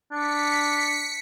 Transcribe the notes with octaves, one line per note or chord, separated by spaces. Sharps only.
D4 B6 C#7